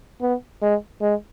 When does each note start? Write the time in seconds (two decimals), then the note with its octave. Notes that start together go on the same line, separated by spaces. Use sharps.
0.22 B3
0.62 G#3
1.01 G#3